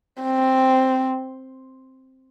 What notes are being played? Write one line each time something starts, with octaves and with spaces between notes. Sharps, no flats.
C4